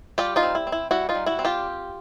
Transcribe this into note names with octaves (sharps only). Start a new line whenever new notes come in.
G3 F4 G4
D#4 F4
C4
E4
C4
E4
G3 E4 F#4
D#4 F4
G3
E4 F#4
C4
F4 G4